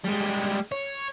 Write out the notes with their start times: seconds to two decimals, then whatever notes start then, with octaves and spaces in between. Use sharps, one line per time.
0.04 G3 G#3
0.72 C#5